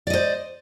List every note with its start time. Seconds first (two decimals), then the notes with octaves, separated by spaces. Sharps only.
0.07 D5
0.10 D#5
0.13 C5